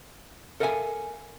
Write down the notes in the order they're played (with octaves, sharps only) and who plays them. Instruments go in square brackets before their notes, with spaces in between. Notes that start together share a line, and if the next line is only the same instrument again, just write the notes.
[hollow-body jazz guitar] A4 A#4 E5 F5 G5 G#5